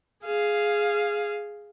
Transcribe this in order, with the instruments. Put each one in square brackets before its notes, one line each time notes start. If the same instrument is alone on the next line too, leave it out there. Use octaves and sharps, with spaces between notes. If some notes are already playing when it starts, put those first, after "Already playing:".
[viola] G#4 F5